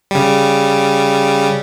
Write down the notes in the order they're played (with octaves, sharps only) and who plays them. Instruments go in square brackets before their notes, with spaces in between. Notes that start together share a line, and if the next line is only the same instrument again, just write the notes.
[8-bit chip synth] C#3 G3